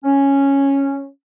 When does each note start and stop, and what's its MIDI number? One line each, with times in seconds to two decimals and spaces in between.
0.04 1.07 61